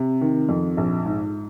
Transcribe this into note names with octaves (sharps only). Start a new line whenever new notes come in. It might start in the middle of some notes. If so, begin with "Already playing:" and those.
Already playing: C3
D#3
F2
A#1
G#2